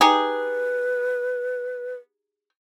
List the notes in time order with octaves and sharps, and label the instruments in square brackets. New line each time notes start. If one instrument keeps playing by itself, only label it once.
[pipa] D#4 G4 G#4 [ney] B4